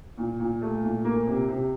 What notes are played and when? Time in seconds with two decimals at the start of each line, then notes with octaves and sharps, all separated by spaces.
0.18 A#2
0.39 A#2
0.61 A3
0.83 A#2
1.05 A#3
1.27 C3
1.49 C3